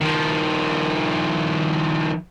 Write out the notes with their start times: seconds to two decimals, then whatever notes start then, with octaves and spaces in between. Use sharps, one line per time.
0.01 D#3 F3